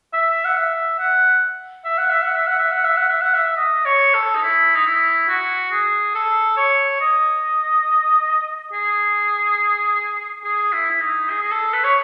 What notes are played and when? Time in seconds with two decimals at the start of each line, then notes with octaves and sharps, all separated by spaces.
0.13 E5
0.45 F#5
0.56 E5
0.99 F#5
1.85 E5
1.98 F#5
2.10 E5
2.22 F#5
2.34 E5
2.47 F#5
2.59 E5
2.72 F#5
2.84 E5
2.97 F#5
3.09 E5
3.21 F#5
3.34 E5
3.57 D#5
3.85 C#5
4.14 A4
4.35 D#4
4.42 E4
4.76 D#4
4.86 E4
5.29 F#4
5.72 G#4
6.15 A4
6.57 C#5
7.01 D#5
8.73 G#4
10.44 G#4
10.73 E4
10.91 E4
11.01 D#4
11.30 G#4
11.42 G#4
11.51 A4
11.73 B4
11.84 C#5